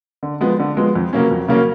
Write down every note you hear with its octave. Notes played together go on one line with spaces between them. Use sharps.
D3
F3 G#3 B3
D3
F3 G#3 B3
F2
C#3 F#3 A#3 C#4
F2
C#3 F#3 A#3 C#4